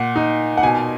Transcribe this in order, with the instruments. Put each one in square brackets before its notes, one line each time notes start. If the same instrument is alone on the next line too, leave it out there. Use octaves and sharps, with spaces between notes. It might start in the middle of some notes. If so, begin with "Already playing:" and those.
Already playing: [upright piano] A#2 F#5
D#4
F#5
B2 G#5